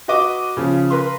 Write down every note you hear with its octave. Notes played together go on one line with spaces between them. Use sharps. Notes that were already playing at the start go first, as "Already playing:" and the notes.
F#4 B4 D#5 D6
C#3 F3
A#4 B4 C6